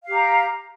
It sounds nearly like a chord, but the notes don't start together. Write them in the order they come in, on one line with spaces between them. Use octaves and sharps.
F5 G4 A#5